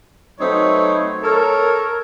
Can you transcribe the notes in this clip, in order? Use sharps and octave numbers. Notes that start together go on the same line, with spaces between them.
F#3 A3 C4 D#4 B4 C#5
A4 A#4 C#5